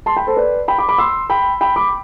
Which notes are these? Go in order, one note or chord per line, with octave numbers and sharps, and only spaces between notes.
A5 C6
G5 B5
A4 C5
B4 D5
G5 B5
B5 D6
B5 D6
C6 E6
G5 B5
G5 B5
B5 D6